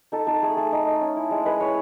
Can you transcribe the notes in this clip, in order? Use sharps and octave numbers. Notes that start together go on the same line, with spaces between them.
D#4 A4
D#4 A4
A3 G#4
A3 A4
D#4
D#4
C#4
E4
G#3
G#3 B4
E4 C#5